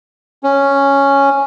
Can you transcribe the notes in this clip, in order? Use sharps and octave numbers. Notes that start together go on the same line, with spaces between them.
C#4